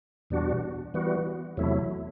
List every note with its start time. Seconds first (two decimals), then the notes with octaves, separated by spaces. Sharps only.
0.30 E2 B2 G3 D4 F#4
0.94 E3 G3 B3 F#4
1.57 E2 C3 F#3 A3 E4